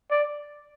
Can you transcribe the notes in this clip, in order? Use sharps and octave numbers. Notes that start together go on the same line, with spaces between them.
D5